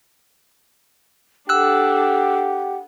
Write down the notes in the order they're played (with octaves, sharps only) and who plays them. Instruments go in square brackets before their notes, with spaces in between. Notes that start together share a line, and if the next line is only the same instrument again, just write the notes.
[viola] D4 A4 [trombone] G4 [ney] F#5 [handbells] E6 F#6